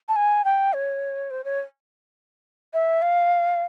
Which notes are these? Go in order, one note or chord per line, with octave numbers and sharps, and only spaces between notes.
A5
G#5
G5
C#5
C5
C#5
E5
F5